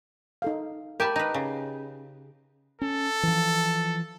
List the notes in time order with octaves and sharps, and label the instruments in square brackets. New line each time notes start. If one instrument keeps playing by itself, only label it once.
[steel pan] D#4 A4 F5
[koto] G4 G#5 A5 [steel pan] A#4 B5
[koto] D#4 B4
C#3
[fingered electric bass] C#4 [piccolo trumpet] A4
[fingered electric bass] E3 F3